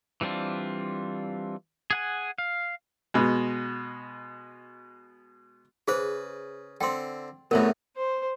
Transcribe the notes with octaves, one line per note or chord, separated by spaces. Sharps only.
E3 G3 C4 D4 F4
G#4 F#5 G#5
F5
B2 G#3
C#3 G#4 B4 C5
D3 C4 G5 C6
C2 A2 C#3 A3 B3 A#4 C#5 E5
C5